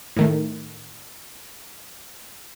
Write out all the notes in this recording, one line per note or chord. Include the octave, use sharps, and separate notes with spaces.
A2 D#3 A3